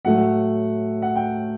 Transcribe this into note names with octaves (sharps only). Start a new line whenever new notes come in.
A2 F#3 A3 F#5
F#5
G5